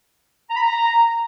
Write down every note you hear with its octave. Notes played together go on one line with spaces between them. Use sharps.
A#5
B5
A#5